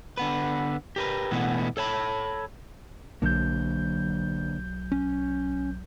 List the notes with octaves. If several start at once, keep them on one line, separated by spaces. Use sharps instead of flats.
D3 B3 B4
G4 A#4 B4
B2 E3 A3 B3
A4 C#5 A5 B5
B1 D3 F#3 A#3 G6
C#4